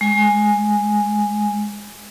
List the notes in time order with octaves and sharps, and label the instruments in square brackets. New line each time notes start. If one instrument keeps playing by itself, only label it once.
[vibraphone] G#3 G#5